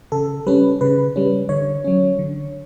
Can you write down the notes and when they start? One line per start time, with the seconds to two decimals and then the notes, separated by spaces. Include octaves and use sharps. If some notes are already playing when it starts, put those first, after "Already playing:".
0.12 C#3 A4
0.46 G3 C#4 B4
0.81 C#3 B4
1.16 G3 C#4
1.49 D3 C#5
1.84 F#3 C#4
2.19 D3